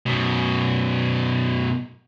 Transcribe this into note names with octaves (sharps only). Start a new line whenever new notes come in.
F#2 B2